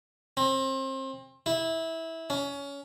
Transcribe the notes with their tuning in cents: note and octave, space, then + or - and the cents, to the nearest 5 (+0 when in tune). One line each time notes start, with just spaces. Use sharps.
C4 +30
E4 -15
C#4 +20